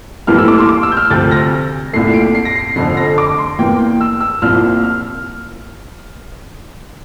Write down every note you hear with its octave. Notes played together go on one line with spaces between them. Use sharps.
A#1 A2 E3 G3 A#3 F6
E6
D6
C6
D6
E6
G6
F6
D2 C3 F3 A6
A#6
C2 A#2 A3 C7
D7
C7
A#6
C7
F1 F2 D3 C7
A#6
D6
C6
E2 E3 A#3 G5
E6
E6
C2 A#2 F3 A#3 F6
F6